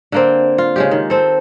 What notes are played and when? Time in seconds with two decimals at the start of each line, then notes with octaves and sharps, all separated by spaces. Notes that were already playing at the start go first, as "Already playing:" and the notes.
0.12 D3 A#3 C4
0.58 F4
0.76 C#3 G#3 G4
0.91 D#3
1.10 C4 A4